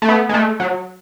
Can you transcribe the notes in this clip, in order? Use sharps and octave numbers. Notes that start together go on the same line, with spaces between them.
A3
B3
G#3
A3
F#3